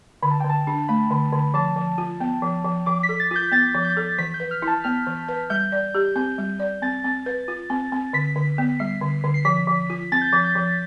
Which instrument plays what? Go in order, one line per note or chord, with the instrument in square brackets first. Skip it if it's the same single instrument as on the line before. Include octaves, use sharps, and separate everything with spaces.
[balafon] D3 [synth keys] B5
[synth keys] A5
G5
[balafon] D3
[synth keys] A5
[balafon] D4
[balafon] A3 [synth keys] B5
[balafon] D3
D3
[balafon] F3 [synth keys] A5
[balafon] F3
F4
[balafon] B3 [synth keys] G5
[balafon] F3
F3
[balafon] F3 [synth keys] D6
[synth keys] B6
[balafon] A4
[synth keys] A6
[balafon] F4 [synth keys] G6
[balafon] B3 [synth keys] A6
[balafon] F3
[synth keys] G6
[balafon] A4
[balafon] E3 [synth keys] B6
[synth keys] G6
[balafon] B4
[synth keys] F6
[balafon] E4
[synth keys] A5
[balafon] B3 [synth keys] F6
[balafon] E3
B4
[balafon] G3 [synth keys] G6
[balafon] D5
G4
[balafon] C4 [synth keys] G6
[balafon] G3
D5
[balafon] C4 [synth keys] A6
[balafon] C4
B4
F4
C4
C4
[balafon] D3 [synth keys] B6
[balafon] D3
B3
[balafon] G3 [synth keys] C7
[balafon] D3
D3
[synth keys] C7
[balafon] F3 [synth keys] B6
[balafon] F3
F4
[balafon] C4 [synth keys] A6
[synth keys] G6
[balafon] F3 [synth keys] A6
[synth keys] G6
[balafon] F3